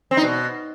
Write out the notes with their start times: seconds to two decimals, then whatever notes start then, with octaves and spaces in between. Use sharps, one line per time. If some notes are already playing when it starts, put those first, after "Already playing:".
0.11 C4
0.17 D#4
0.23 B2